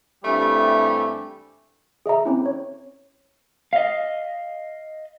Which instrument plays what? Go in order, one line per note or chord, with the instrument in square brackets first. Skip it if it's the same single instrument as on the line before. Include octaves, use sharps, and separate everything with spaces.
[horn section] G2 E3 G3 A3 C4 G4
[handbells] G#4 D#5 E5 A#5
C4 C#4 E4
C#5
[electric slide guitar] D#5 F5